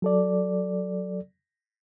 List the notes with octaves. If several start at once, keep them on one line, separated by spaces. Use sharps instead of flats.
F#3 A4 D5